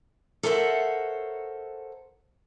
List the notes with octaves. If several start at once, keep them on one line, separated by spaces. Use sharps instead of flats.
A4 A#4 C5 C#5 E5 F#5